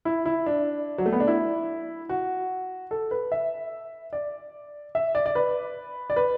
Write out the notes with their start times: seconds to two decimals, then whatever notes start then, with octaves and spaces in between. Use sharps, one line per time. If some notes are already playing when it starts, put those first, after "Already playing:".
0.05 E4
0.26 E4
0.46 D4
0.98 F#3
1.06 A3
1.13 B3
1.20 D4
1.27 E4
2.09 F#4
2.91 A4
3.11 B4
3.32 E5
4.13 D5
4.95 E5
5.15 D5
5.26 D5
5.35 B4
6.10 D5
6.16 B4